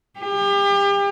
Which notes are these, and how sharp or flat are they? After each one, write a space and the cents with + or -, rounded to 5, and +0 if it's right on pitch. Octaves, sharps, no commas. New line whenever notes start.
G4 +35